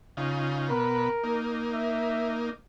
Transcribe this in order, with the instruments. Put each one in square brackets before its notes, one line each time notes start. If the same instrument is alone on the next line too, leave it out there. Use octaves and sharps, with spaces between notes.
[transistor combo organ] C#3 D#4 F4
[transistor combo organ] B2 B4 [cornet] A#4
[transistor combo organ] A#3 D#4
[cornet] E5